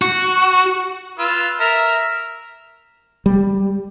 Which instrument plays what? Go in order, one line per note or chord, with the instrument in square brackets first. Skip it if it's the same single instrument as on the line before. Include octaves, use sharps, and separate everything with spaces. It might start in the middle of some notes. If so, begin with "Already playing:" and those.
[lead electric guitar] F#4
[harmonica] F4 B4 E6
A#4 E5 F6
[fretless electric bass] G3